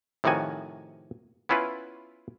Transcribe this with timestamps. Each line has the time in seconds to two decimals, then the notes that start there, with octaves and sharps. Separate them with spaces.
0.24 A2 C3 D#3 F3 F#4 G#5
1.49 B3 C#4 E4 F4 B4